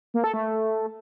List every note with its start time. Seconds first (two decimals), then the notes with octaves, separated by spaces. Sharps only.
0.14 A#3
0.24 A4
0.34 A3